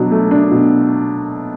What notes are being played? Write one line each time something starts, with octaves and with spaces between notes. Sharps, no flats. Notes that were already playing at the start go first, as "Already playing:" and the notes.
Already playing: B2 F#3 D4
A3
D4
B2